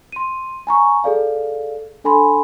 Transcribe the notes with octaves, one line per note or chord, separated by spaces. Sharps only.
C6 D#7
G#5 A#5 C#6
G#4 A4 D5 F5
D4 A4 G#5 B5 C6